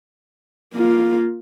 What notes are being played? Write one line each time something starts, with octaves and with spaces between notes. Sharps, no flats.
A#3 F4